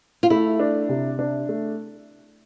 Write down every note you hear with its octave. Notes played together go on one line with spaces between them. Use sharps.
F4
A3 E4
D4
C3
D4
A3